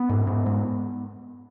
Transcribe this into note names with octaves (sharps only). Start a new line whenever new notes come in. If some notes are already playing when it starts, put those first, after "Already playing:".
Already playing: B3
G#2
G#2
G#2